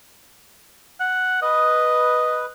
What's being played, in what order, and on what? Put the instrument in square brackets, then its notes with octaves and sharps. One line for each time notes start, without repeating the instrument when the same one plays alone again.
[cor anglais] F#5
[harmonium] B4 [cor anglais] D#5